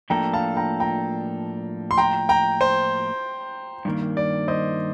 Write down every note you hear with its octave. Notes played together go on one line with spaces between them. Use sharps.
A2 F3 A#3 D4 A4 G5 A#5
F5 A5
G5 A#5
G5 A#5
C6
G5 A#5
G5 A#5
C5
G2 D#3 A#3
D5
C5 D#5